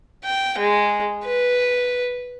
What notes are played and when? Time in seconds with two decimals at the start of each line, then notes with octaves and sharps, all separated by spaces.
0.24 G5
0.59 G#3
1.25 B4